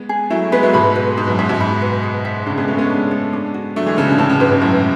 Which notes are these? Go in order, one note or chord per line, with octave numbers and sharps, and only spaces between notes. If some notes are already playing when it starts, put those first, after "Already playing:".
Already playing: G#3 B3
G#4
F#3 A3 E4
G#3 B3 B4
F#3 A3
G#2 B2 B5
B4
G#2 G#4
F#2
G#2 E5
G#2 B2
B5
B4
G#4
E5
A2 C#3 D4
G#3 B3
A3 C#4 F#4
G#3 B3
D4
A4
D4
F#4
F#3 A3 D4
E3 G#3
C#3 E3 A4
B2 D3
A2 C#3 A5
A2 C#3
G#2 B2 B4
G#2 B2
F#2 A2 E4